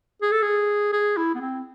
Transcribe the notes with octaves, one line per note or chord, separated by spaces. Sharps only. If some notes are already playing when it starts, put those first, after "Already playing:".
G#4
A4
G#4
G#4
E4
B3
C4